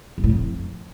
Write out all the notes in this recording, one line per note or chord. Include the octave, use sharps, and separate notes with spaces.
A#2
A2
F2